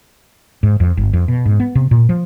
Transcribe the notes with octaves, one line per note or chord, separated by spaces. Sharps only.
G#2
F2
G1
F2
B2
G#2
B3
C3
A#2
F3